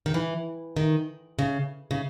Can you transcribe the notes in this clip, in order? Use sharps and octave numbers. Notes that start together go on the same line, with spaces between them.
D#3
E3
D#3
C#3
C#3